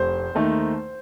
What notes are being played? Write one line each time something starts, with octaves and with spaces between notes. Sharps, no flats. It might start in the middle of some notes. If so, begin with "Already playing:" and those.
Already playing: F1 C5
D#2 D#3 A3 D#4